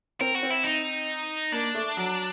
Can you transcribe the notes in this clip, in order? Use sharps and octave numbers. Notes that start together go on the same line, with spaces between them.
C4 A#4
F#4
C4
E4
D#4
A#3 D4
A3
F#3